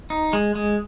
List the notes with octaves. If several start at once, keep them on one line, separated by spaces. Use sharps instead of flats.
D#4
G#3
G#3